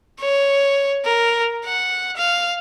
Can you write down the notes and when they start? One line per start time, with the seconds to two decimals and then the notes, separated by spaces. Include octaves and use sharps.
0.20 C#5
1.05 A#4
1.65 F#5
2.17 F5